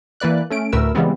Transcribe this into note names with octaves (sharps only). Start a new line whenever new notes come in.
E3 A#3 B4 D5 F#6
A3 C#4 D7
D2 A2 A3 A#4 B4 E6
C#3 E3 G3 G#3 B3 C4